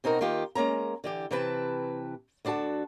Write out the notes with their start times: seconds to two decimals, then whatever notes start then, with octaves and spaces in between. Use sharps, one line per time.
0.04 B2 C4 D#4 F#4 A#4
0.21 D#3 A#3 F4 G4
0.55 G#3 A#3 C#4 A#5
1.04 D3 E3 G4
1.31 C3 E3 C4 B4 A5
2.45 D2 D4 F#4 A4 A5